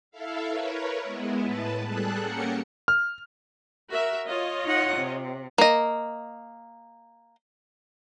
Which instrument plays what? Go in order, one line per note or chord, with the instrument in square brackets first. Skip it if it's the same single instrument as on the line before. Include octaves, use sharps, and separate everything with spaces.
[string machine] E4 A4 E5 F5
A#4 B4 C#5
G#3 B3 E4
A2 B4 A5
G3 G#4 A4 A5 F#6
A#3 C#4 G4 A#4 F#5 C#7
[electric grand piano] F6
[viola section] F#4 A#4 E5
F4 C#5 D#5
[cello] D#4 F#5
C3
[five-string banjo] A#3 D#5